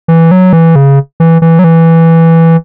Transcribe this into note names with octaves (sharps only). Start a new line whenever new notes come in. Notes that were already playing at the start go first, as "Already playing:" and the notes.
E3
F#3
E3
C#3
E3
E3
F#3
E3